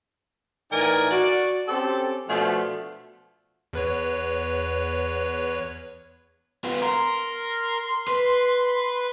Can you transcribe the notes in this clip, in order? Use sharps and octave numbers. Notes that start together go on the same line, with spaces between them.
A2 E3 D#4 A#4 D5 G#5
F#4 D5
C4 C#4 G4 A4
B2 F3 A3 D4 F4
E2 B4 C#5
B3 F4
A#4 C6
B4